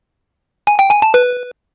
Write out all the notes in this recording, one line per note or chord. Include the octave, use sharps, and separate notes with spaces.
G#5
G5
G#5
A5
B4